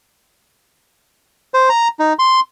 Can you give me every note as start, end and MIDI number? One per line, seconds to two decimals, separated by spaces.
1.54 1.69 72
1.69 1.88 82
1.99 2.13 63
2.19 2.40 84